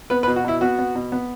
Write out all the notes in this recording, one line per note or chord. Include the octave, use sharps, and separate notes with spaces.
B3 B4
B4
B2
F#4
B2 E4
B3 F#4
B3
B2
B3